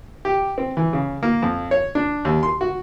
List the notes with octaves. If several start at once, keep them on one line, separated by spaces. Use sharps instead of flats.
G4
C4
E3
C#3
A#3
F2
C#5
D4
D#2
C6
F#4